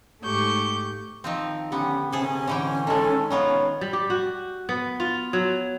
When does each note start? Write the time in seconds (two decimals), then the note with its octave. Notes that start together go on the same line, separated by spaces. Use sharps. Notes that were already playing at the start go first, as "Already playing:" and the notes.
0.23 G#2 A3 G4 C#6 G6
1.24 D#3 F3 C4
1.72 D3 B3 C#4 G4
2.12 C3 C#4 G#4 A4
2.47 D3 E3 G5
2.87 D#3 G#3 A4
3.30 D#3 B3 F4 C#5
3.81 G3
3.93 G4
4.10 F#4
4.69 B3
5.00 F4
5.33 F#3